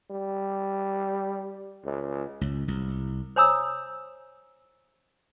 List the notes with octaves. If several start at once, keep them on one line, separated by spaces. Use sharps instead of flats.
G3
C#2
C#2
C2
C5 C#5 G#5 A#5 D#6 E6